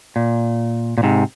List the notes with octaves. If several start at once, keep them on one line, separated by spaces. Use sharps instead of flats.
A#2
A#2
G#2 C3